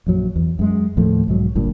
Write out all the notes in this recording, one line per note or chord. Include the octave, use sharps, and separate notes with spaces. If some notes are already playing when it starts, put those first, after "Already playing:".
A#1 F#2 F#3
E2
F#2 G#3
D#2 A2 F3 A3
B1 G#2 F#3
G1 G2 A#2